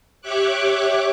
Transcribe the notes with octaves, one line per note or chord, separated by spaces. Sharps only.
G4 C#5 E5 C#6 D6 F#6